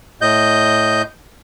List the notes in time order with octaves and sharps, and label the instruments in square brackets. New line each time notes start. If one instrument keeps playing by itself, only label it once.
[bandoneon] A2 D#5 G6